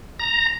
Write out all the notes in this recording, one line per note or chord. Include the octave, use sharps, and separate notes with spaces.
A#5